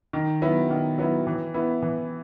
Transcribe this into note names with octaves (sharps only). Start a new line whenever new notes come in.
D#3
F#3 B3 E4
D#3
F#3 B3 E4
E3
B3 E4
E3